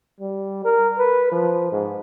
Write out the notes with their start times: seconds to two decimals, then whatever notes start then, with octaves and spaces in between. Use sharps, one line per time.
0.21 G3
0.65 A#4
0.99 B4
1.32 F3
1.72 G#2